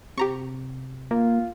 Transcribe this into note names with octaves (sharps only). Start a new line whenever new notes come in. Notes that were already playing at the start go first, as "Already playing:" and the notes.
C3 G4 A#5 C#6
A#3 F4